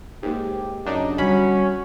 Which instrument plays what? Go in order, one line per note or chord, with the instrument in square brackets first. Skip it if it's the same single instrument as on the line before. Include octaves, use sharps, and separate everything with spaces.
[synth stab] D#2 G#2 [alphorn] G4
[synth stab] F#2 D4 D#4 [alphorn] C#3
[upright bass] D3 G3 [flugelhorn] C#4 [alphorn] F#4 [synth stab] B5